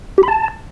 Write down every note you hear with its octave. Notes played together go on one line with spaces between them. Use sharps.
G4
B5
A5